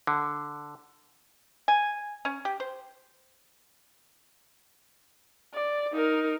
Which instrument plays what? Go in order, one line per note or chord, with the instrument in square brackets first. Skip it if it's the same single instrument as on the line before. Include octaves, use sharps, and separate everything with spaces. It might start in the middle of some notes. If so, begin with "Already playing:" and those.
[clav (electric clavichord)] D3
[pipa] G#5
C#4
G4
C5
[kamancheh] D5
D#4 A#4